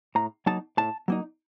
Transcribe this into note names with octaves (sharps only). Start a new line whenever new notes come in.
A2 A#5
F#3 A#3 D#4 A5
A2 A5
F#3 A#3 D#4